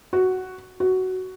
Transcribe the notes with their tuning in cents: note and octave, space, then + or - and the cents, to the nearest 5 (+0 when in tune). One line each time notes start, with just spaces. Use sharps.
F#4 +5
F#4 +10